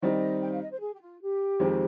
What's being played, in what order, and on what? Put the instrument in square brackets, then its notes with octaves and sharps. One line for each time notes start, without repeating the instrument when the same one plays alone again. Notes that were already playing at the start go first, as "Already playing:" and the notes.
[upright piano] D#3 G3 C4 D#4 [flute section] D#5
[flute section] G5
F5
D#5
C5
G#4
G4
F4
G4
[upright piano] F2 D#3 G#3 C4